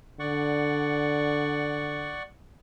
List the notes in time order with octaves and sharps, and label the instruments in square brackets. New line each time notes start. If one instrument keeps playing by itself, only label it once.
[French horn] D3 [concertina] D5 F#5 C#6